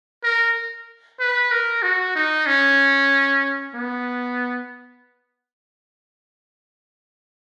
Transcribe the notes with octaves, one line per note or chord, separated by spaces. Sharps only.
A#4
B4
A#4
F#4
D#4
C#4
B3